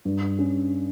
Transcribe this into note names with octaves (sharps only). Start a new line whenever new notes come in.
G2
C#4